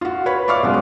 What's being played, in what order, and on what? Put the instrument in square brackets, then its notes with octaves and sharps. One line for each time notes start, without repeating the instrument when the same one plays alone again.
[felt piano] F4 F#4
B4 C#5 B5
D5 E5 F5 C#6 D6 F6
B2 F#3 G#3 C#4 F#4